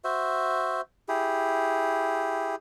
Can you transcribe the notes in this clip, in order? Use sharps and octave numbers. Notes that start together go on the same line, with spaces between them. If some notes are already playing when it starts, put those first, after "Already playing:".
F#4 C5 E5
E4 G4 G#4